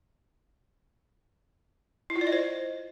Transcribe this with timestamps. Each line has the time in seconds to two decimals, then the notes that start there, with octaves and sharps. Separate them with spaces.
2.10 E4
2.16 F4
2.21 D5
2.27 D#5
2.32 C5